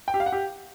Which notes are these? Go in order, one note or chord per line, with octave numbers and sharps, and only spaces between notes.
G5
G4
F5
F#5
G4